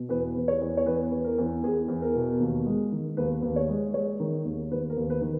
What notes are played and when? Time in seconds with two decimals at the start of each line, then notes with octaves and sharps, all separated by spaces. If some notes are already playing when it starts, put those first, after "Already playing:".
Already playing: B2
0.09 E2 B4
0.36 E2
0.48 C#5
0.61 E2
0.77 C#5
0.86 E2 B4
1.12 E2
1.24 A#4
1.38 E2
1.63 E2 G#4
1.88 E2
2.02 A#4
2.15 B2
2.40 D#2
2.66 G#3
2.92 D#3
3.17 D#2 B4
3.42 D#2
3.56 C#5
3.69 G#3
3.94 G#3 C#5
4.20 D#3
4.45 D#2
4.71 D#2 B4
4.90 A#4
4.97 D#2
5.10 B4
5.22 D#3